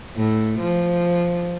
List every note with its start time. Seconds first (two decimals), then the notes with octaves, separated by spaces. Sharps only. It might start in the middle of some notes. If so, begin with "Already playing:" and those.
0.16 A2
0.60 F3